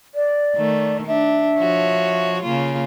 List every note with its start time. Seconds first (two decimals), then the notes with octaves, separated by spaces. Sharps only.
0.15 D5
0.56 D#3 A3
1.07 D4 E5
1.59 F3 F#4 C#5
2.43 C#3 A#3 F4